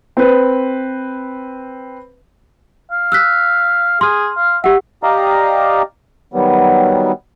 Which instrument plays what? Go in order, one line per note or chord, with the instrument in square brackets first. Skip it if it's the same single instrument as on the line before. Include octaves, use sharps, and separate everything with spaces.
[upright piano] C4 B4
[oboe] F5
[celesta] E6 F#6 B6
[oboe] G#4 [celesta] C6 F6
[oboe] F5
[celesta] G4 F#5 [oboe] E5
[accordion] G4 D5 D#5 F5 A#5
D#3 F#3 G3 B3